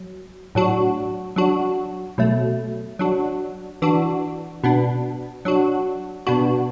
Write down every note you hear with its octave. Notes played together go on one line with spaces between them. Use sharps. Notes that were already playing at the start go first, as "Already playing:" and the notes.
Already playing: F#3
A2 F#3 D4 F#4
F#3 D4 F#4
B2 F#3 A3
F#3 D4 F#4
E3 D4 F#4
B2 B3 D4
F#3 D4 F#4
B2 B3 D4 F#4